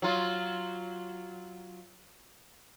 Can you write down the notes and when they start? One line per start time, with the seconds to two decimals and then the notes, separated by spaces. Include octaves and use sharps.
0.02 F#3 F4